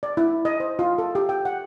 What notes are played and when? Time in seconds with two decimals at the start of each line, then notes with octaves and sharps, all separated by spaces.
0.03 D5
0.17 E4
0.45 D#5
0.60 C5
0.79 F4
0.98 A4
1.15 G4
1.29 G5
1.45 F#5